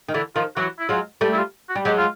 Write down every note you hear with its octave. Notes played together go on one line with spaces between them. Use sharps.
D#3
D3 E3 E4
D#3 F3 F4
E3 F#3 F#4
E4
F#3 G#3 F4
G3 A3
E4
F4
F#4
G3
F#3 G#3 G4
F4